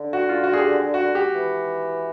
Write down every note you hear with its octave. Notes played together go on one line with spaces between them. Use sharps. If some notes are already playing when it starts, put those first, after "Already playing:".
Already playing: D3
F#4
F4
F#4
G#4
G4
F#4
G4
E3